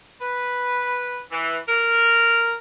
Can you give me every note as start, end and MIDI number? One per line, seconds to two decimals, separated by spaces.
0.21 1.20 71
1.32 1.57 52
1.69 2.54 70